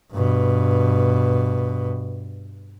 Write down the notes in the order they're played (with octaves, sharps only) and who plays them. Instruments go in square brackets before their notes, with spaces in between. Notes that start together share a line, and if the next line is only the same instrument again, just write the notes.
[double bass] G2 B2